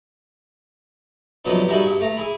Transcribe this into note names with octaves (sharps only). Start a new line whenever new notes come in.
C2 F2 D3 F#3 B3 D#4
G3 D#4 E4 F#4 G#4 A4
G2
A3 A#5
E4 G#4 D6